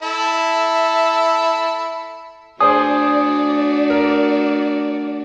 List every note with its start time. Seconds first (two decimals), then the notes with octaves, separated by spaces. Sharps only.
0.03 E4 A4 E5
2.61 A3 D4 F#4 G#4 C5 D5 D#6
3.90 A#4